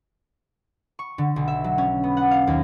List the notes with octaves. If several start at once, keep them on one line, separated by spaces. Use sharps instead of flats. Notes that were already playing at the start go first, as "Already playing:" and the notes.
C#6
D3
B1
E5
F#3
C#4
B3
F#5
F5
D#2